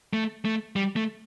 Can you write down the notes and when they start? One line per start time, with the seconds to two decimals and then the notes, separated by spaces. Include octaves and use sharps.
0.13 A3
0.45 A3
0.76 G3
0.96 A3